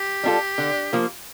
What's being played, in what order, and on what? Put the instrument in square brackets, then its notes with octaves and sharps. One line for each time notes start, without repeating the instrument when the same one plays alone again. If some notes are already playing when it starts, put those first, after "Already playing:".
Already playing: [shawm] G4
[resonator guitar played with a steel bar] G3 D4 F4 A4
D3
F3 A#3